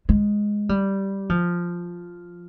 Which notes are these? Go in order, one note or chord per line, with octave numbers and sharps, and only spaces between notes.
G#3
G3
F3